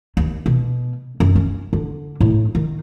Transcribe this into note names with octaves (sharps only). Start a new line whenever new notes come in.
D#2
B2
F#2
C#4
D3
A2
D#3